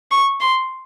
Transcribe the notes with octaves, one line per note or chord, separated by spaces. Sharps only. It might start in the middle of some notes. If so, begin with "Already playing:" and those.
C#6
C6